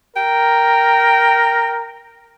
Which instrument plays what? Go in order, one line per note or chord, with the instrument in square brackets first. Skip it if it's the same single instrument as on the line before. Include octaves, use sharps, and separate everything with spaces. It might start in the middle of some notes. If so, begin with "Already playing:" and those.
[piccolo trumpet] A#4 [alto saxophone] G5